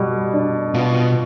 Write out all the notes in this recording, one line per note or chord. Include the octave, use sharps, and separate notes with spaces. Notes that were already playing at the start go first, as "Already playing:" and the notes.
Already playing: B2 G3
D4
B2 F4